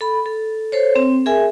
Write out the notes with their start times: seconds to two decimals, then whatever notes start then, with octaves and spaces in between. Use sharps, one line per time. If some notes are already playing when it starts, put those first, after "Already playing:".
0.01 A4 B5
0.26 A4
0.72 A4 C5 C#5
0.96 C4
1.26 G#4 A#4 E5 G#5